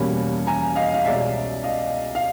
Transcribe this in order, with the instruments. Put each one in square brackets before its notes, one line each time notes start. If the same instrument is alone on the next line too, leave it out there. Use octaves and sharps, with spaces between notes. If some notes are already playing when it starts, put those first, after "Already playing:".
Already playing: [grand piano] E2 B2 G3 A#3 C#4 B5
G#5 A#5
D#5 F5
F5
C2 B2 G#3 C#4 D5 E5
D#5 F5
F5